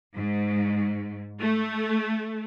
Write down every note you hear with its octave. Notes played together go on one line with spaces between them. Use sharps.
G#2
A3